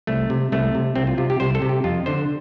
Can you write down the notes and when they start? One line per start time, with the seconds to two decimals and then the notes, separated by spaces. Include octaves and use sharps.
0.07 C2 A3
0.30 C3
0.52 C2 A3
0.75 C3
0.95 C2 C4
1.07 F4
1.18 C3 F4
1.30 G4
1.40 C2 C5
1.55 A4
1.62 C3
1.69 G4
1.84 F2 F4
2.06 D3 C5